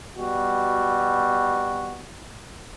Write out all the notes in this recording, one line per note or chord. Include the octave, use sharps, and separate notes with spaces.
B2 G3 F#4